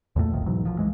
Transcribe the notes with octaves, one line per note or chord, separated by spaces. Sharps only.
E2 A#2 G3 A3
F1 B1 F2 D#3
G#2 B2 E3 F#3
A#1 F#2 F3
C2 E3 G#3